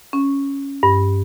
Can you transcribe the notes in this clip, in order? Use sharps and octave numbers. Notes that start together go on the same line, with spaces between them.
C#4
G2